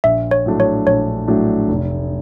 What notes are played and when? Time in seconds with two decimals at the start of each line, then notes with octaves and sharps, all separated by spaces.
0.04 A#1 E5
0.31 C#5
0.46 A2 F#3 A3 D4
0.60 C#5
0.87 A#1 C#5
1.28 A2 F#3 A3 D4
1.69 F1